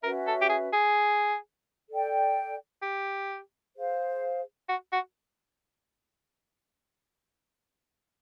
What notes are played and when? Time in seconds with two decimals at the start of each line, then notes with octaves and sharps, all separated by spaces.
0.03 C#4 F#4 A#4 B4 E5
0.27 A4
0.42 G4
0.49 G#4
0.73 G#4
1.89 A4 D5 G5
2.82 G4
3.76 G#4 C5 F5
4.69 F#4
4.92 F#4